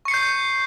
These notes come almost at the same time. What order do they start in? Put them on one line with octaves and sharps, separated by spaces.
C#6 C#7 C7 G6